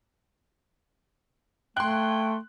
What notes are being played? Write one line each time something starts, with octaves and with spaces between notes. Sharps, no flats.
A3 G5 C6 F#6